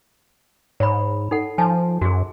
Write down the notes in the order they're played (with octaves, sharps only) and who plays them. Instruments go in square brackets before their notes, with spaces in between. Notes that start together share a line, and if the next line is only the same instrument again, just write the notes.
[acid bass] G#2 [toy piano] C#5 B5
[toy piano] D#4 A4 F#5
[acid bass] F3 [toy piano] G#5 A5
[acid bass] F#2 [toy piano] F#4 G#4